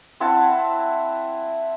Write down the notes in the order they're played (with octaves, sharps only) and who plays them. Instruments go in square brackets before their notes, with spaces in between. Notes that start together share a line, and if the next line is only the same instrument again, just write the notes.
[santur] C4 E4 F#5 A5